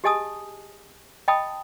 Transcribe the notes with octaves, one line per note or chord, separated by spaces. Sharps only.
G4 G#4 D#5 G#5 A5 D#6
D#5 G5 A5 B5 D#6